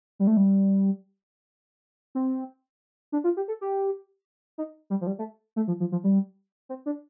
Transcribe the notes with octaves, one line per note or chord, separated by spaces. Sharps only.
G3
A3
G3
C4
D4
F4
G4
A4
G4
D#4
G3
F3
G3
A3
A3
F3
F3
F3
G3
C4
D4